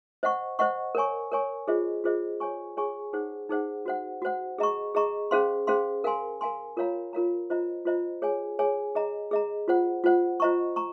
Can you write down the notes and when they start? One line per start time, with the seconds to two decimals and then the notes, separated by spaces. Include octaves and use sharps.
0.23 C5 D#5 F#5 C#6
0.59 C5 D#5 F#5 C#6
0.95 A#4 C#5 G#5 C#6
1.31 A#4 C#5 G#5 C#6
1.68 F4 G#4 C5 D#5
2.04 F4 G#4 C5 D#5
2.40 G#4 C#5 G#5 C#6
2.77 G#4 C#5 G#5 C#6
3.13 D#4 G#4 C5 F#5
3.49 D#4 G#4 C5 F#5
3.86 F#4 C5 F#5
4.22 F#4 C5 F#5
4.58 G#4 D#5 A#5 C#6
4.95 G#4 D#5 A#5 C#6
5.31 C#4 G#4 C5 F5 C6
5.67 C#4 G#4 C5 F5 C6
6.04 A#4 F5 G#5 C6
6.41 A#4 F5 G#5 C6
6.77 F4 A#4 C#5 F5 A#5
7.13 F4 A#4 C#5 F5 A#5
7.50 F4 C5 D#5 A#5
7.85 F4 C5 D#5 A#5
8.22 G#4 C#5 G#5
8.59 G#4 C#5 G#5
8.95 G#4 D#5 A#5
9.31 G#4 D#5 A#5
9.68 F4 C5 F#5
10.04 F4 C5 F#5
10.40 F4 C5 D#5 A#5 C#6
10.76 A#5 C#6